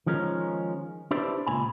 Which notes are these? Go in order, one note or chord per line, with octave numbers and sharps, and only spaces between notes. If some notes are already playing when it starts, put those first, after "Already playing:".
D#3 F3 G#3 C#4 A#4
D4 E4 G4 B4 C5 D5
C#2 A#2 G#5 B5